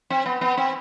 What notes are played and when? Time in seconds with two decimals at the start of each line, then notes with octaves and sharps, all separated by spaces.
0.10 C4
0.26 B3
0.41 B3
0.57 C4